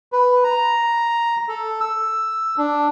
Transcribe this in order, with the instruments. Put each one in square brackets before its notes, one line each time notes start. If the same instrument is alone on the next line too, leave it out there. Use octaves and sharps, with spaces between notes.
[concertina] B4
A#5
A4
E6
D4